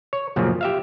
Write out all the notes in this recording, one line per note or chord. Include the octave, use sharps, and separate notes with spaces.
C#5
F#2 A#2 C#3 F3
G4 E5 F5